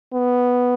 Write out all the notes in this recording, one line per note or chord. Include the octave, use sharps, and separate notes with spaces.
B3